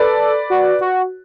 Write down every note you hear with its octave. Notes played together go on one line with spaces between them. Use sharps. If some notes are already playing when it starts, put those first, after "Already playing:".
Already playing: A4 B4 D5
F#4
F#4